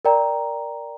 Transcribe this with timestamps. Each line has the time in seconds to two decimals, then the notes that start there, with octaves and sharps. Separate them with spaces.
0.05 A#4 D5 G5 A#5